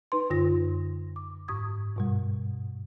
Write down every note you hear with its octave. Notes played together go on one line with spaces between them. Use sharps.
D#4 B4 C6
F#2 D3 F4 A#6
D6
G#2 C#6 D#6 G#6
G2 B2 G3